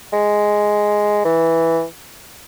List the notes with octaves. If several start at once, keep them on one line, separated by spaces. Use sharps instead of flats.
G#3
E3